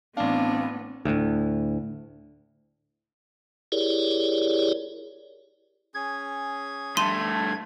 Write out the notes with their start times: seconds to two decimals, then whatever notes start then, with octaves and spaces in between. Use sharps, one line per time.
0.17 A1 B3 C4 D4 F5
1.05 D2 A2
3.72 E4 G4 G#4 A#4 C#5 D5
5.94 C#4 G#4 G#6
6.97 G2 A3 C6 D#7